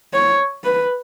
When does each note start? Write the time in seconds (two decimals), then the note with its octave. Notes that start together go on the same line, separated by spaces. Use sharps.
0.13 C#5
0.64 B4